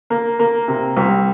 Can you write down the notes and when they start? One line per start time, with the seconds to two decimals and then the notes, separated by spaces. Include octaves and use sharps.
0.10 A#3
0.39 A#3
0.68 C3
0.97 C2